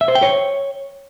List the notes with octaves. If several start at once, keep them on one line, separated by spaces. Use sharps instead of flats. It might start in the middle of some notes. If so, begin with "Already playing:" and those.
E5
C5
G5
C#5